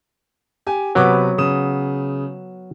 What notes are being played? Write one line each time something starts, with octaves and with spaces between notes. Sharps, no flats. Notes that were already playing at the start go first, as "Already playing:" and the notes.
G4 G#5
C3 F#3 B3 B4 D6
C#3 D#6 E7